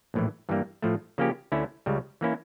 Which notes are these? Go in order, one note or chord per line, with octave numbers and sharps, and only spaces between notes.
A#1 A2 E3
G2 E3 G3 A#3
A2 F3 A3
C#3 F3 A#3 C#4 G4
D2 D3 A3 C#4 E4
C#2 C#3 G3
E3 A#3 C#4 E4